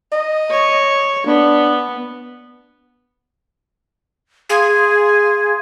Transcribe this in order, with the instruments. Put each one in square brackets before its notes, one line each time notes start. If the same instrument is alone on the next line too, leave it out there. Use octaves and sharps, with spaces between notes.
[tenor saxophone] D#5
[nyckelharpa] C#5
[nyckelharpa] B3 [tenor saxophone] D4
[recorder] G#4 [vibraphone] F5 C6 D#6